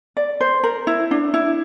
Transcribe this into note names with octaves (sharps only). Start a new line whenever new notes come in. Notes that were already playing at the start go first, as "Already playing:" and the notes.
D5
C5
A#4
E4
D4
E4